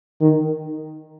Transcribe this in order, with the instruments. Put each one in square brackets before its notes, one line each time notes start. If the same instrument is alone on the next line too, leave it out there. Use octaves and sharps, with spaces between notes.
[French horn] D#3